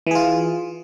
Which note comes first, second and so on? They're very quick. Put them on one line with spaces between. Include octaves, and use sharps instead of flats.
E3 G#4 F4